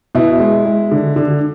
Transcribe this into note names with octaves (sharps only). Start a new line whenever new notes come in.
B2 E4
G#3
G#3
D3
D3